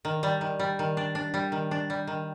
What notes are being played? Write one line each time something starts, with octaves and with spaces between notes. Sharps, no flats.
D#3
G3
D#3
G3
D#3
D4
D4
G3
D#3
D4
G3
D#3